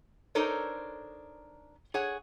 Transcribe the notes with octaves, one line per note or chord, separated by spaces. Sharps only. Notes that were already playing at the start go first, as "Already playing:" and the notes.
D4 D#4 A4 A#4 C5 C#5
G#4 C#5 F#5